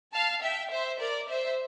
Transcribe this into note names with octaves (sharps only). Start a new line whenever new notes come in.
F5 A5
E5 G5
C5 E5
A#4 D5
C5 E5